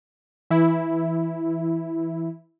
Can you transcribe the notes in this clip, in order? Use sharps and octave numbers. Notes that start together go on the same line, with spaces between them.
E3 E4